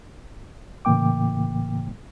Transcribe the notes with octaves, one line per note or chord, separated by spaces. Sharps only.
A2 C#3 E3 A#3 G5 D6